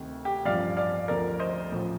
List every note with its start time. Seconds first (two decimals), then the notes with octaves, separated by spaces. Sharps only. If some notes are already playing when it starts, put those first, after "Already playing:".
Already playing: D2 C3 D#3
0.25 G4
0.45 A1 G2 F3 D5 F5
0.77 D5 F5
1.08 D2 D3 F3 A#4 D5
1.40 C5 D#5
1.72 A1 A2 F3